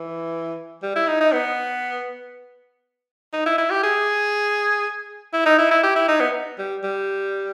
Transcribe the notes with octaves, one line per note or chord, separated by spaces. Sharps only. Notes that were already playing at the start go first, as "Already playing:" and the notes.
Already playing: E3
G3
E4
D#4
D#4
B3
D#4
E4
E4
G4
G#4
E4
D#4
E4
E4
G4
E4
D#4
B3
G3
G3